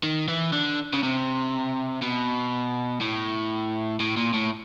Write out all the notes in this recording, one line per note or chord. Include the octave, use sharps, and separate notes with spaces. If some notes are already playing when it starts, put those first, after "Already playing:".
D#3
E3
D3
C#3
C3
B2
A2
A2
A#2
A2